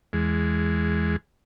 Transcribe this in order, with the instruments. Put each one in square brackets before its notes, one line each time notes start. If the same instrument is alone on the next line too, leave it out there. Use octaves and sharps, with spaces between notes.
[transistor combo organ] E2 G#3